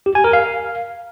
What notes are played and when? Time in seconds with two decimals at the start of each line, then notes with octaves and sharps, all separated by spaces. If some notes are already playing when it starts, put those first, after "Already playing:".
0.06 G4
0.15 G#5
0.24 A#4
0.33 F5